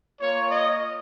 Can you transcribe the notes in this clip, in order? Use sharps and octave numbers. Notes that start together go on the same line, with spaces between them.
A#3 F4 C#5
D#5